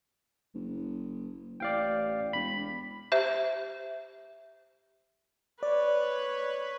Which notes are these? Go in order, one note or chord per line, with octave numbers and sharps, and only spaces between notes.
F#1
A1 D5 F5 G5
E1 B5
G4 C5 E5
B4 C#5 D5